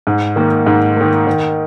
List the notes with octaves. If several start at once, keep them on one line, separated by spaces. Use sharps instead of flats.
G#2
D#3 A#3
G#2
D#3 A#3
D#3